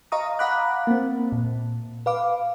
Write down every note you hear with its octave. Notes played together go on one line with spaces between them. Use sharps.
D#5 F5 A#5 C#6 D#6
F5 F#5 A#5 B5 D6 F#6
A#3 C4
A#2
B4 F5 D6